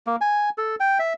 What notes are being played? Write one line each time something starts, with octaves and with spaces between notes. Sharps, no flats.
A#3
G#5
A4
G5
E5